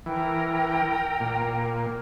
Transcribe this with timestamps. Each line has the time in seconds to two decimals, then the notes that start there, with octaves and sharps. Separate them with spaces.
0.06 E3 A#4 G5
1.20 A#2